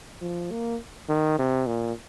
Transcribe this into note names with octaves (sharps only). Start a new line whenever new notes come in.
F3
A#3
D#3
C3
A#2